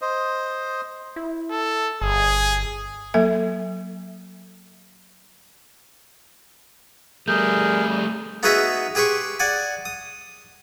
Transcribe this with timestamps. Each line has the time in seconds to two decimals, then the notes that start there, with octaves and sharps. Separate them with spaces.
0.02 C5 D#5
1.16 E4
1.51 A4
2.01 G1 G#4
3.14 F#3 A#3 A4 E5
7.28 G3 A3 G#4 A#4 G6
8.43 B3 D#4 F#4 G#4 B4 E5
8.95 G4 G#4 B4 C6 C#6
9.40 D5 F#5 G#5
9.85 D#6